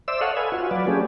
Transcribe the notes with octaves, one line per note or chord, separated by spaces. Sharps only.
C5 D5 E5 E6
A4 C#5 D#5 F5 F#5
B4 G#5
F4 F#4
F#3 B4 D5
A3 C#4 G4 G#4